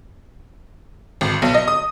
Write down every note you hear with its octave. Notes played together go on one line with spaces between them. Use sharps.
G#1
B1
D#5
D#6